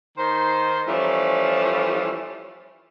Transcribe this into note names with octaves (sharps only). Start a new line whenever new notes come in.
D#3 C5
E3 F3 G3 A3 C#4